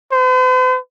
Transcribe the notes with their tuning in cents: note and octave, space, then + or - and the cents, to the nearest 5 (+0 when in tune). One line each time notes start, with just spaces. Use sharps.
C5 -45